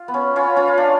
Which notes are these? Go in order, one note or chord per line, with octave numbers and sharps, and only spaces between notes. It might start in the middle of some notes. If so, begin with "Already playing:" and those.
Already playing: F4
B3
C#4
C#4 F4
C#4 F4
F4
D4